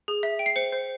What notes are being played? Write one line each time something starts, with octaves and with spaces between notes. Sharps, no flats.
G#4
E5
G5
C7
C5 C#7
C5